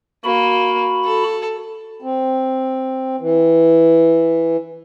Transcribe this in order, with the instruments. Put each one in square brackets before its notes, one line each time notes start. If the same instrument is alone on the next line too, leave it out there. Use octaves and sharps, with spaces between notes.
[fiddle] A#3 [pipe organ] F#4 B5
[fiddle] A4
[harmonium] C4
E3